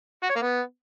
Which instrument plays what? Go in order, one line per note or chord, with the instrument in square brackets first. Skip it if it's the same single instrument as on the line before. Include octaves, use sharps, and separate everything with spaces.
[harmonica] F#4
C#5
A#3
B3